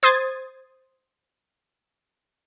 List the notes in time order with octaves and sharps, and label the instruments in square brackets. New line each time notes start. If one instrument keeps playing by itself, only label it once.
[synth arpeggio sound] C5 C6 D#6 G#6 A6